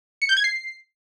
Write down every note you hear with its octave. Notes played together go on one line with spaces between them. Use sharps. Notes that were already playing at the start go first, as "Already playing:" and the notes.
C#7
G6
G#6
C7